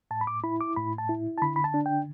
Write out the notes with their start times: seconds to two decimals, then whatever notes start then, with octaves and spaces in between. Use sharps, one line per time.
0.11 A2 A5
0.21 B5
0.27 D6
0.44 E4 B5
0.61 D6
0.76 A2 B5
0.98 A5
1.09 E4
1.38 A5
1.42 D3 B5
1.56 B5
1.64 A5
1.74 D4
1.86 G5